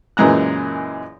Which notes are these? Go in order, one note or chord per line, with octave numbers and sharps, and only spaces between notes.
F#2 A#2 E3 G#3 A#5 F#6